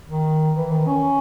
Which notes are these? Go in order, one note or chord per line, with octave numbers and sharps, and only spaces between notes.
D#3
E3
D#3
C#4